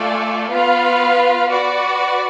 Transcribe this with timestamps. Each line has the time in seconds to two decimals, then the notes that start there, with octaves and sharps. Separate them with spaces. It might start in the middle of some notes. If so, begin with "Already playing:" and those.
Already playing: A3 F4 A4 D5 G#5
0.49 B3 F4 B4 F5
1.48 F#4 B4 D5